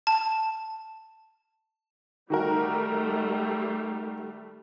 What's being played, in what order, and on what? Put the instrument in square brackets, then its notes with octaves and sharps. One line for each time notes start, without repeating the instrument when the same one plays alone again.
[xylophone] A5
[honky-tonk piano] D#3 F#4 A#4 [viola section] G3 A3